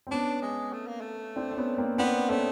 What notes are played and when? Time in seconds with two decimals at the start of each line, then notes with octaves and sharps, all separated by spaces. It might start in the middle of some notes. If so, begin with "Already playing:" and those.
0.07 C4
0.11 B3 C#4 D4
0.42 G#3
0.73 A3
0.87 A#3
1.01 A3
1.36 C4 D4
1.51 C4
1.57 B3 C#4
1.78 A#3 C4
1.98 B3 C4 D4
2.30 A3 B3 C#4